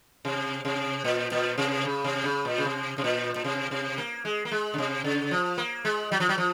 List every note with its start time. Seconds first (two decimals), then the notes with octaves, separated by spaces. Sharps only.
0.25 C3
0.65 C3
1.04 A#2
1.32 A#2
1.58 C3
1.85 C#3
2.04 C3
2.24 C#3
2.45 A#2
2.58 C#3
2.65 C3
2.98 C3
3.04 A#2
3.36 A#2
3.44 C3
3.71 C3
3.98 A#3
4.25 G#3
4.45 A#3
4.52 G#3
4.74 C#3
4.78 C3
5.04 C#3
5.31 F3
5.58 A#3
5.85 G#3
6.12 F#3
6.20 F3
6.29 F#3
6.38 F3